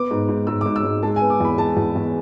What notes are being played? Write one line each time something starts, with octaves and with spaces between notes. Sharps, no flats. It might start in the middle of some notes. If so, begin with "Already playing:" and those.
Already playing: B3 D6
G#2
G#2
G#2 E6
D6
G#2
E6
G#2
G#3 A5
G#5
B3
D6
E2 B5
G#3 A5
E2
E2